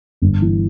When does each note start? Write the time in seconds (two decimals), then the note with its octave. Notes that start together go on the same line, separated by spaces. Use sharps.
0.22 G1
0.42 E3